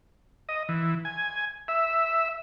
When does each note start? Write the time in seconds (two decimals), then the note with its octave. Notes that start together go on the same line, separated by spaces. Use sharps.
0.49 D#5
0.69 E3
1.05 G#5
1.68 E5